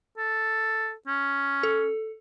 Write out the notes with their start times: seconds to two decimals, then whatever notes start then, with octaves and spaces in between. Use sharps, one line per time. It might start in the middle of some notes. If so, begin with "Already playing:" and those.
0.17 A4
1.07 C#4
1.63 A4